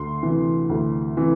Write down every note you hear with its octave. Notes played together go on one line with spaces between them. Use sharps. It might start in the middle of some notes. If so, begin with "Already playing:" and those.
Already playing: D2 C6
C3 E3
D2
C3 E3